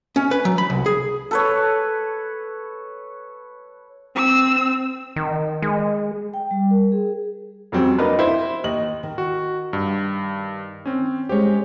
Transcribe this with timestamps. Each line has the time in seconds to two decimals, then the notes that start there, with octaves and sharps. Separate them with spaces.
0.16 C#4
0.31 B4
0.45 F#3
0.58 B5
0.70 C2
0.86 G#4
1.31 A4 B4 C#5
4.15 C4 E6
5.16 D#3
5.62 G#3
6.34 G5
6.51 G3
6.71 A#4
6.92 G#4
7.72 F2 F#3 G3 C4 C#4
7.98 A#3 D4 D#4 A#4 B4
8.19 E4 C5
8.64 D#2 D#5 F#7
9.03 D#3
9.18 F#4
9.73 G2
10.86 C4 C#4
11.29 G#3 C#4 G4 C5 C#5